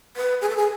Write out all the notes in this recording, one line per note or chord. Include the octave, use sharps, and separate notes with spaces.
B4
G#4
A4
G#4